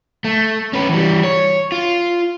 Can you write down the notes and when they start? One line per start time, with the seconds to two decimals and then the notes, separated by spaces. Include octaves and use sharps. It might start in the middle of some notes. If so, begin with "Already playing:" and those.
0.24 A3
0.73 C#4 B4
0.89 E3 G3
1.24 C#5
1.72 F4